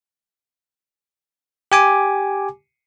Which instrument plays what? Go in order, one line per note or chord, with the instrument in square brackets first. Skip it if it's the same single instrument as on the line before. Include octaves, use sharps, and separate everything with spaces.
[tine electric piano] G4 G#5 D6